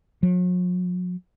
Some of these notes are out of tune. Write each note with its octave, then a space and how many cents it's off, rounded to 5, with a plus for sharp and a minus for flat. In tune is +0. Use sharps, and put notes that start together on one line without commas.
F#3 -45